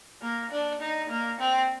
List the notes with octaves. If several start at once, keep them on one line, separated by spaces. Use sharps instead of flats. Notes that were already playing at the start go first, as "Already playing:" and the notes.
A#3
D4
D#4
A#3
C4